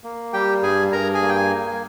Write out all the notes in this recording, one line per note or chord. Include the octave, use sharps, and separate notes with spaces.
A#3
G3 G4 G5
G2 G#4 G#5
G2 A#4 A#5
G#4 G#5
A#3
G5
G#5